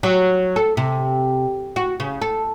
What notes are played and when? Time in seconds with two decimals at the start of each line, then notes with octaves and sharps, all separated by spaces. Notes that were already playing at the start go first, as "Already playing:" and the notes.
0.03 F#3
0.56 A4
0.77 C3
1.76 F#4
2.00 C#3
2.22 A4